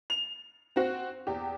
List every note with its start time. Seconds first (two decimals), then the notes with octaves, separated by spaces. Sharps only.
0.10 F7
0.76 C4 F#4
1.27 E2 G4